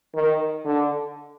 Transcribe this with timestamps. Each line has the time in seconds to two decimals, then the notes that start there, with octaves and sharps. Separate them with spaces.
0.15 D#3
0.65 D3